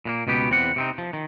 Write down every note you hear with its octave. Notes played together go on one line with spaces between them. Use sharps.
A#2 G#3 A#3
C#2 B2 B3 G4
E2 C4 F#5
C3 C4 D#4
F3
D#3